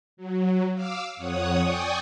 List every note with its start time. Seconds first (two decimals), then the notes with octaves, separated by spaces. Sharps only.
0.17 F#3
0.74 F5 D6 E6
1.17 F2 C#5 F#5 D#6
1.61 D5 G5 G#5 C#6 D#6